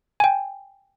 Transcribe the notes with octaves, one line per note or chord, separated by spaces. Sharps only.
G5 G#5